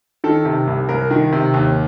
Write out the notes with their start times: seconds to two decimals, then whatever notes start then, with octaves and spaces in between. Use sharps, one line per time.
0.24 D#3 A4
0.45 C3
0.67 C2
0.89 C2 A#4
1.11 D#3
1.32 C3
1.54 D#2